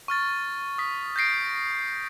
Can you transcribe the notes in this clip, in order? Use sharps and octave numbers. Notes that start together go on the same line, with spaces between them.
C#6 F6 A6
D#6 B6
G6 A6 A#6 C7 D7